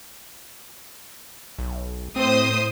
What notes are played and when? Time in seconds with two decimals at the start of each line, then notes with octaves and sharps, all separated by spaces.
1.59 B1
2.16 A2 C4 C5 D#6